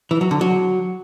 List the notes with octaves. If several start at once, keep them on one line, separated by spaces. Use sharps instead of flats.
E3
F#3
D3
F#3